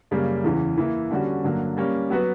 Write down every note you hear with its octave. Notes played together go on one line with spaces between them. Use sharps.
F#2 C#3 G3 A#3
E2 C#3 E3
E3 A#3 E4
D3 G3 C#4 F#4
G2 D3 F#3 A#3
G3 A#3 C#4
F#3 B3 F#4 B4